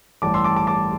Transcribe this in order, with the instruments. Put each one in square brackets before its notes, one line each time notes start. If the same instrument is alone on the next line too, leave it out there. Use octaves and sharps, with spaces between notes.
[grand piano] A1 G2 G3 A5 D6
C6 E6
A5 D6
A5 D6
A5 D6